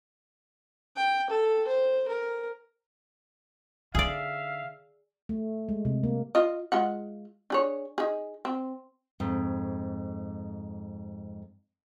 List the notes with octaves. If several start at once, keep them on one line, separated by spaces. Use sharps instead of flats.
G5
A4
C5
A#4
D3 D#4 G#4 D5 E5 F5
A3
G#3
C3
A#3
F4 D#5
G#3 F4 F#5
D4 G#4 C#5
D#4 G#4
C4
F2 G#2